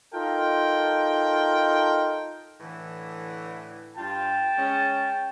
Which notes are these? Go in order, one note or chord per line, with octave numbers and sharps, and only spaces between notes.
D#4 F4 A4 A#4 G5
A2 D3 E3
G2 F4 G5 A5
G#3 C#4